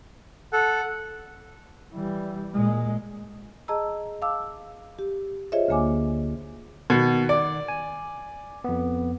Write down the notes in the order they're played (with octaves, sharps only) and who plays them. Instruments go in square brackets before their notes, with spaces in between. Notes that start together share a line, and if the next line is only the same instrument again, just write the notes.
[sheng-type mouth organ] A4 [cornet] F#5
[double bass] E3 G3
A#2 G#3
[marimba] G#4 D#5 A5 A#5 E6
F5 A5 D6 E6
G4
F4 G#4 C5 C#5 D#5 E5
D2 D3 A#3 G#5 D6
[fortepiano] B2 [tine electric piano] D#3 F#5 G#6
[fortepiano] D5
[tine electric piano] G#5
F2 B3